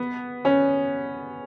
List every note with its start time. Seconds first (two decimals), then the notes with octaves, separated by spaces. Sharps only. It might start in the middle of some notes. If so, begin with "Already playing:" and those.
Already playing: B3
0.45 C#4